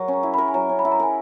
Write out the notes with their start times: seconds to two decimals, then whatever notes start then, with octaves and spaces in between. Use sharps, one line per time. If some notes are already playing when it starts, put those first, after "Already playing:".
Already playing: F#3 A#4
0.08 C#4
0.13 A#5
0.23 E4
0.34 A#4 B5
0.48 G#5
0.54 F#3 A#5
0.69 C#4
0.79 B5
0.85 E4
0.92 A#5
1.00 A#4 G#5